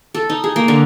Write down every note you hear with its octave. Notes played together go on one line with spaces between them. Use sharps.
A4
D#4
G#4
A#3
D3